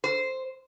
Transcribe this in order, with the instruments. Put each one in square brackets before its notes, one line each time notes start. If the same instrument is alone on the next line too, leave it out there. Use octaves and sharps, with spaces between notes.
[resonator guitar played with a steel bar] C5